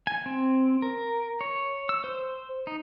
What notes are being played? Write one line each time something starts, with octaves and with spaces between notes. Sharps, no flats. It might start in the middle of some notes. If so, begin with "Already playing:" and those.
G#5
C4
A#4
C#5
E6
C5
D#4